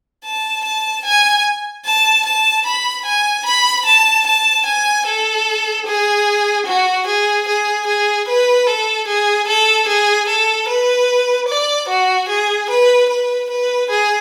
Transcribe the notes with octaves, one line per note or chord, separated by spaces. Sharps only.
A5
A5
G#5
A5
A5
B5
G#5
B5
A5
A5
G#5
A4
G#4
F#4
G#4
G#4
G#4
B4
A4
G#4
A4
G#4
A4
B4
D5
F#4
G#4
B4
B4
B4
G#4